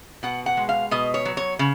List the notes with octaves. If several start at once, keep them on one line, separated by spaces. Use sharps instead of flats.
B2 F#5
F#5
G#3
F5
B2 D#5
C#5
F#3
C#5
C#3